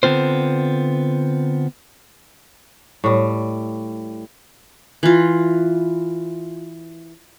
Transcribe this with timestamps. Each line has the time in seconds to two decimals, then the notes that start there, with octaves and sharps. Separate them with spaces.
0.03 D3 B3 C4 F4 C5
3.04 A2 G3
5.03 E3 F4